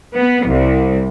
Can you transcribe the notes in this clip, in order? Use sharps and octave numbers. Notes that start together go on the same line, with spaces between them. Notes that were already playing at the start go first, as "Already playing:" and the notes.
B3
C2